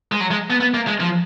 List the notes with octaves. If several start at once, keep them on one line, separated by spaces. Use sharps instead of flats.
G#3
F#3
G#3
B3
B3
A#3
G#3
F3